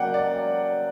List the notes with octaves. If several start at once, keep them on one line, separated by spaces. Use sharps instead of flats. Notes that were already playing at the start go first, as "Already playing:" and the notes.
Already playing: C#3 F#3 A#3 D5 F#5 G5
D5